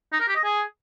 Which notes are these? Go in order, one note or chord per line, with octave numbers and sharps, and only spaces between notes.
D#4
A#4
G4
D#5
G#4